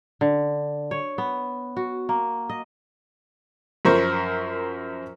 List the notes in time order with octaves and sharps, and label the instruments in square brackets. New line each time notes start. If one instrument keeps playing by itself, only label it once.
[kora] D3
C#5
B3
F#4
A#3
D#5
[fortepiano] F#2 F3 A#4 C5 C#6